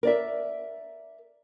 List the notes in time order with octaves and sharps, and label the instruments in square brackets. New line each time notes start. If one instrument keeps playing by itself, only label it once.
[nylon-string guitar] A#4 D5 E5